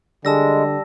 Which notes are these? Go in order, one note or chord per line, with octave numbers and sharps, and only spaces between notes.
D3 G3 G#3 A5 E6 A#6